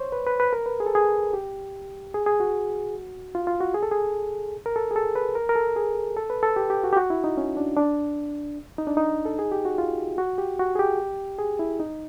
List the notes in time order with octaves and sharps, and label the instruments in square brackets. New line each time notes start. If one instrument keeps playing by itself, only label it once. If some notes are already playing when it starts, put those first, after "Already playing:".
Already playing: [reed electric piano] C5 C#5
B4
B4
B4
A#4
B4
G#4
A4
G#4
G4
G#4
G#4
F#4
F4
F4
F#4
G#4
A4
G#4
A#4
A4
G#4
A4
B4
A#4
A#4
A4
G#4
A4
B4
A4
G4
G4
F#4
G4
F#4
E4
D#4
C#4
D4
D4
D#4
D4
D#4
A4
G#4
G4
F#4
F4
F#4
G4
F#4
G#4
G4
G#4
E4
D#4